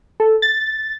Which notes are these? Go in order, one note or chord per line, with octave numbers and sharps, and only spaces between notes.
A4
A6